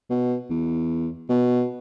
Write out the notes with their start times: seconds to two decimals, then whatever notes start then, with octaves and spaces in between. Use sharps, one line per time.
0.10 B2
0.50 E2
1.29 B2